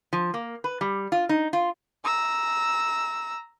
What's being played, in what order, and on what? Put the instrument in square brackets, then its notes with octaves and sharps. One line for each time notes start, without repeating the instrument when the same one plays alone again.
[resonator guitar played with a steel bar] F3
A#3
B4
G3
F4
D#4
F4
[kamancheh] A#5 E6